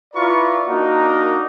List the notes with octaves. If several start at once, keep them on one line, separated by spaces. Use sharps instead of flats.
E4 F4 B4 D5 A#5 C#6
A#3 D4 D#4 F#4 A#4